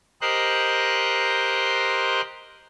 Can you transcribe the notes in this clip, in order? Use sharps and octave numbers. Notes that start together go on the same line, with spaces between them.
G4 A#4 C5 D#5 C6 F#6